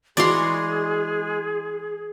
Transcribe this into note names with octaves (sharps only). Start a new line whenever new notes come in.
E3 G#3 F#4 G#4 D5 A#5 C6